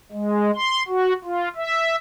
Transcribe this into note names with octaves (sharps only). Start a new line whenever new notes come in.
G#3
C6
F#4
F4
E5